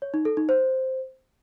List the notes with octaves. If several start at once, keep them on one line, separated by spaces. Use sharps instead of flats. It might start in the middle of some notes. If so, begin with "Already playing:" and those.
C#5
D#4
A4
D#4
C5